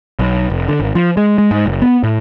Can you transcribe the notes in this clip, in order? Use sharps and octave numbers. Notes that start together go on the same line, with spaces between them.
B1
F1
D3
G#1
F3
G#3
G#3
G#2
F#1
B3
A2